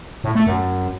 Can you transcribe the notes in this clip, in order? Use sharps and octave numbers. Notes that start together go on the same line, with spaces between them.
A2
A3
F#2